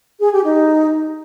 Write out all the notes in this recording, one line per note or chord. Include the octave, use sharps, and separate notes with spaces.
G#4
G4
D#4